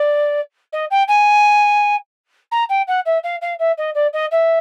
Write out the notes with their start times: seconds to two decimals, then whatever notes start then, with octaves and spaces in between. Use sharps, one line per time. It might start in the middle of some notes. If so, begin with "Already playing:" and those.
Already playing: D5
0.73 D#5
0.91 G5
1.08 G#5
2.52 A#5
2.69 G5
2.88 F#5
3.06 E5
3.24 F5
3.42 F5
3.59 E5
3.78 D#5
3.95 D5
4.13 D#5
4.31 E5